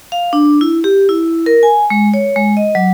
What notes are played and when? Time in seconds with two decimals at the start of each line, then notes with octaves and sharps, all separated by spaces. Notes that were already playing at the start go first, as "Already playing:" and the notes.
0.12 F5
0.33 D4
0.61 E4
0.84 G4
1.09 E4
1.46 A#4
1.63 G#5
1.90 G#3
2.14 C#5
2.36 G#3
2.57 D#5
2.75 F#3